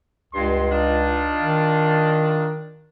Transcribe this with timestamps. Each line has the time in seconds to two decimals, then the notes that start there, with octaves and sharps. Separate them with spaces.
0.34 C#2 G2 C6
0.71 D4 D#4 F4
1.40 D#3